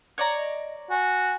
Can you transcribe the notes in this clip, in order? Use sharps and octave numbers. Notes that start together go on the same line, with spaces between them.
C#5 D5 A#5
D#5
F#4 G#5